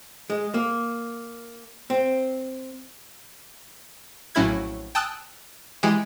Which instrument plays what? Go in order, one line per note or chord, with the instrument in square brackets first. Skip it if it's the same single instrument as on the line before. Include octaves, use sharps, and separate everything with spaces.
[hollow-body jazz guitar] G#3
A#3
C4
[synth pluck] A#1 A2 F#3 C#4 E4 G#6
G5 A5 D#6 E6 F#6
E3 G#3 G4 G#4